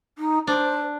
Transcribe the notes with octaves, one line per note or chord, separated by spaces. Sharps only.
D#4
D4 C5